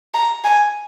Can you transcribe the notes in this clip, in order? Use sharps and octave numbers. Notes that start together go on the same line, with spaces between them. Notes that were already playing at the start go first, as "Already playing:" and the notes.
A#5
G#5